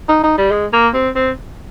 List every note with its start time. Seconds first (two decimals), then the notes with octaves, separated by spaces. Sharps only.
0.09 D#4
0.23 D#4
0.38 G3
0.51 G#3
0.73 A#3
0.94 C4
1.16 C4